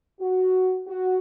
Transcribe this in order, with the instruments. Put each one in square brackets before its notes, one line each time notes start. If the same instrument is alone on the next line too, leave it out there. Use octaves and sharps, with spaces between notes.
[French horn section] F#4
F#4